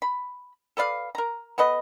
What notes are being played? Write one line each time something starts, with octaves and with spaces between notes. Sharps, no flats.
B5
A4 B4 D5 F5
A#4 A#5
B3 A4 B4 D#5